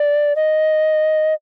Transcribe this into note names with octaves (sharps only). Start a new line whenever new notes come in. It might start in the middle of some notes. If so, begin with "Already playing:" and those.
Already playing: D5
D#5